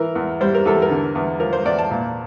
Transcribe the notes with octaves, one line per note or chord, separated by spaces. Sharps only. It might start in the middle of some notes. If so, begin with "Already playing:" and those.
Already playing: E3 A#4
E2
G3 C5
A#4
E2 A4
A#4
D3
E2
F3 A#4
C5
E2 D5
A5
A#2